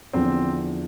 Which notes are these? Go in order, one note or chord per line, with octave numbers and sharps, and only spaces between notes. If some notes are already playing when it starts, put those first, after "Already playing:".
E2 D3 F3 C4